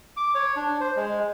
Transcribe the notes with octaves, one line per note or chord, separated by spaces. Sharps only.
D6
C#5
D4
C5
G#3